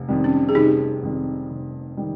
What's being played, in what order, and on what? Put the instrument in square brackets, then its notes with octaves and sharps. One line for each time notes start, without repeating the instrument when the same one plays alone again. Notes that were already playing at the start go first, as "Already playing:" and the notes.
Already playing: [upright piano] F1
F2 D#3 G3
[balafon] C#4
G#4
[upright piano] F1 [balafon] D#4 G4
[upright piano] F2 D#3 G3
F1
D#3 G3